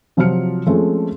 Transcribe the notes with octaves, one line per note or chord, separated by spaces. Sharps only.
C3 F3 F#3 F4 F6 C#7
F3 G#3 A3 C4 C#4